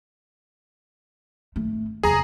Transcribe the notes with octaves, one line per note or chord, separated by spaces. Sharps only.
G#1 A3
E2 C3 G#4 A#5